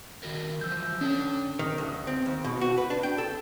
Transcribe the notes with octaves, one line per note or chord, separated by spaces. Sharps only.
D#3 F#4 A#4
E3 F3 E6 G6
C#4 D4 A4
D#3
D2
C4
D#2
B2
F#4
B4
D4
G5
A4